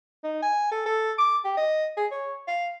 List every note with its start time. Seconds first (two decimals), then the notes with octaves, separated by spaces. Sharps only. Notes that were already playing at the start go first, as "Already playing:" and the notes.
0.24 D#4
0.42 G#5
0.71 A4
0.86 A4
1.18 D6
1.44 G4
1.57 D#5
1.97 G#4
2.11 C#5
2.48 F5